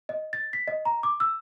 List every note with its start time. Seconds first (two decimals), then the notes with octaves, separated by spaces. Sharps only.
0.09 D#5
0.33 A6
0.53 B6
0.68 D#5
0.85 A#5
1.03 D6
1.20 E6